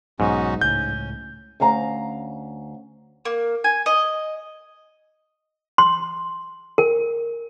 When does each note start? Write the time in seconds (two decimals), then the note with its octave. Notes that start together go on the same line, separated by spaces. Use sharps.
0.20 B1 G#2 F#3 B3 C#4 D#4 F#4
0.61 C#2 A2 C#4 G6
1.60 D2 C#4 F5 A#5
3.25 A#3
3.64 G#5
3.86 D#5
5.78 C6
6.78 A#4